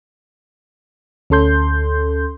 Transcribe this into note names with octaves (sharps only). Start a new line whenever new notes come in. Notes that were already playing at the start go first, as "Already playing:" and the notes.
D2 C#4 A4 C6 G6